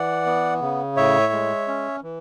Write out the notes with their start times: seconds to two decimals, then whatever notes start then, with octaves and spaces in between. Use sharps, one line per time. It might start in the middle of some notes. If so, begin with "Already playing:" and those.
Already playing: E3 D5 F#5
0.26 B3
0.61 C#3
0.97 A2 C#5 E5
1.32 G#3
1.68 C#4
2.03 E3